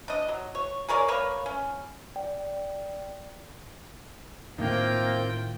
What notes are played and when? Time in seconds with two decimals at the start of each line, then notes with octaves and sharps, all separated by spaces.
0.08 D4 D#5
0.28 F#3
0.55 C#5
0.88 G#4 A#4 C#5 D5
1.08 A#3 B4 C#5
1.46 C#4
2.16 D5 G5
4.58 A2 D#3 A#3 C4 F4 G5